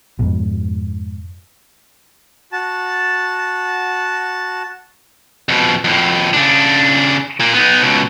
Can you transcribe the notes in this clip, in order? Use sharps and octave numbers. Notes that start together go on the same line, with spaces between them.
F2 G#2 B2
F#4 A5
F2 B2
F2 A2
C#3 D4
A#2 A#3
B3 D#4
C#2 B2